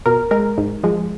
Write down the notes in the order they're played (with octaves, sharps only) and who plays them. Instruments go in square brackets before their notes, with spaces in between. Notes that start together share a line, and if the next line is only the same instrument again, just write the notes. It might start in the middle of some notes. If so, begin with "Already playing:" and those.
[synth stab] B2 A#4
G#3 A#4
G#2
F3 G#3